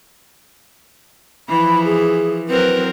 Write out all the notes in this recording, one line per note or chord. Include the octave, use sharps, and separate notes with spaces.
E3 F3 B5
G#4
F#3 C4 A#4 B4